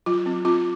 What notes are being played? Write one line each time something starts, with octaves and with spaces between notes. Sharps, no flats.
F#3 F4
C4
C4 F4